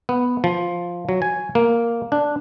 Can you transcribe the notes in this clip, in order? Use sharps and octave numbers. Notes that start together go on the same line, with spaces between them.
B3
F3
F#3
G#5
A#3
D4